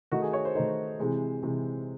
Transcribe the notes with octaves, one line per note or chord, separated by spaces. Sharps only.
D#3 A3 D#4 F#4
G#4
C#5
C5
D#3 A3 D#4 C5
C3 E3 G#3
C3 E3 G#3